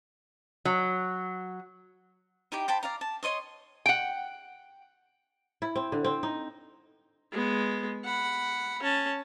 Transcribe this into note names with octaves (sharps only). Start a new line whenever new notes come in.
F#3
D#4 E4 G4 G5
C5 G5 A5 B5
D5 F5 A#5
A5
C#5 D#5 C6 D#6
F#5 G5
E4
C4
D3
C4
D#4
G#3 B3
F#5 B5
C#4 A5